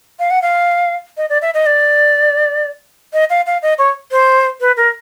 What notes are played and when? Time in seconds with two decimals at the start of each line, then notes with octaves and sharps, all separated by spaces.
0.19 F5
0.30 F#5
0.42 F5
1.17 D#5
1.29 D5
1.42 E5
1.54 D#5
1.66 D5
3.13 D#5
3.30 F5
3.46 F5
3.62 D#5
3.78 C#5
4.11 C5
4.60 B4
4.77 A#4